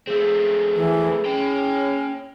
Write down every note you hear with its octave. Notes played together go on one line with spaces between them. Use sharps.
A3 C4 G#4 E6
E3
C#4 C#5 G5